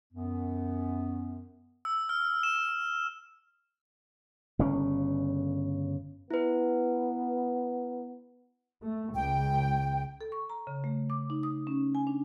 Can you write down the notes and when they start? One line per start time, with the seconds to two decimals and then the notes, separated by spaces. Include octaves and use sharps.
0.13 F#2 B3
1.85 E6
2.09 F6
2.43 E7
4.59 G1 C#3 C#4
6.30 B3 E4 B4
8.83 A3
9.15 C#2 G5
10.21 A4
10.32 C#6
10.50 A#5
10.67 C#3
10.84 A3
11.10 D6
11.30 D#4
11.43 D#6
11.67 C#4
11.95 G#5
12.07 D4